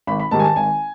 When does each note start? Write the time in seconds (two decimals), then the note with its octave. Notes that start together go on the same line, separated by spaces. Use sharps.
0.07 G#1 B5
0.20 B5
0.31 G#2 D#3 G3 A5
0.39 G#5
0.44 A5
0.56 G#1 G#5